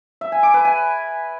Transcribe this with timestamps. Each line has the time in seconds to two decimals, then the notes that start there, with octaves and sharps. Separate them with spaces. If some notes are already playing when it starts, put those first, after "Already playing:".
0.21 E5
0.32 G#5
0.43 D6
0.54 B4
0.65 G#5